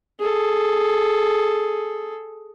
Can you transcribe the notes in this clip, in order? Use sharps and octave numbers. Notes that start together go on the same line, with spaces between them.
G#4 A4